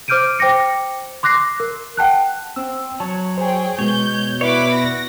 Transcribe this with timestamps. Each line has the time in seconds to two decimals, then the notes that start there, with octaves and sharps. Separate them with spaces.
0.08 C5 D6 F6 G6 D7 D#7
0.39 C5 G5 D6 A#6 C#7
1.23 C6 D6 F#6 A#6 C7
1.60 A#4
1.97 F#5 G5 A5 F#6
2.56 C4 E6
3.00 F#3 C#5 A5
3.38 G#4 C5 G5 G#5
3.79 B2 G#3 C#5 G6
4.41 E4 B4 C#5 D5 E5 F#5 B5 D6
4.72 F#4 A#6